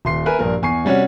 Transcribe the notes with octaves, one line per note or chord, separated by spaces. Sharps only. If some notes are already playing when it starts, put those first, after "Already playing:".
D#1 C6 C7
A#4 B4 E5 G#5
A#1 G2 A#2 A#4
E2 G#5 C#6 C7
C3 G3 C#4 F#4 C#5